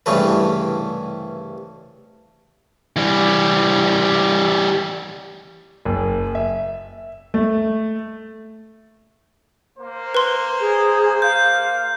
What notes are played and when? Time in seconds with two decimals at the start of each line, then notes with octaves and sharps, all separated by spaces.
0.06 C2 G2 C#3 E3 A3 B4
2.96 E3 G3
5.85 F#1
6.35 E5
7.34 A3
9.78 A#3 C5
10.15 B4 C6
10.59 G#4
11.22 F5 G6